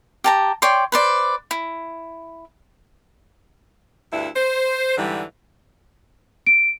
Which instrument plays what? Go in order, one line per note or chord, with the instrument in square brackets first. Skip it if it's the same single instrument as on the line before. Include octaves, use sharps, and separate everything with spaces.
[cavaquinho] G4 A5 A#5
C#5 D5 G5 C6
B4 C5 D5
E4
[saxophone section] D2 G2 E4 E5
C5
G#2 D3 E3 G3
[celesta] D7